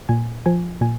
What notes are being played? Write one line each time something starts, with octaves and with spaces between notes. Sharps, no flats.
A#2 G#5
F3 G#5
A#2 G#5